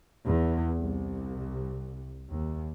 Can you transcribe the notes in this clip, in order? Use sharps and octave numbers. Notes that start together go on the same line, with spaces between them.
E2
C2
D#2